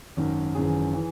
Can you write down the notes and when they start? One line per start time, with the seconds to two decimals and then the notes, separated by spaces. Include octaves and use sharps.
0.17 G#1 F#2 D#3
0.55 G#1 F#2 E3 G#4
0.93 E3